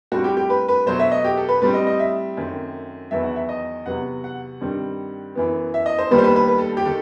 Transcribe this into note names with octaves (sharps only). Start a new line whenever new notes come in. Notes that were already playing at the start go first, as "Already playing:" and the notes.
A2 G3 C4 F#4
G4
G4
B4
B4
B2 F#3 A3 C5
E5
D#5
G4
A4
B4
A2 G3 C4 B4
D#5
D#5
E5
F#2 D#3 A3 C4
E2 D#3 F#3 B3 E5
F#5
E5
D#5
E2 C3 F#3 B3 F#5
F#5
G2 D#3 G3 C4
F#2 E3 B3
E5
D#5
C5
D#2 D#3 G3 B3 B4
C5
B4
B4
B4
A4
G4
D#3 A4